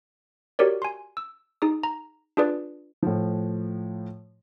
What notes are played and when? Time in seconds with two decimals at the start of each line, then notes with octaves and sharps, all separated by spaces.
0.59 F#4 G4 A#4 C#5 D5
0.82 G#5 C6
1.17 E6
1.62 D#4 G#4 D#6
1.83 A#5
2.37 D4 F4 G#4 B4 D5
3.03 A2 F3